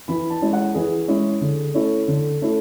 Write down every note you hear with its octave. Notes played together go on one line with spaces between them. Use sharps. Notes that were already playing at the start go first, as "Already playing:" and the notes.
E3 B5
A5
G#3 C#4 E4
F#5
E3 G#4
G#3 C#4 E4
D3
A3 C#4 E4
D3
A3 C#4 E4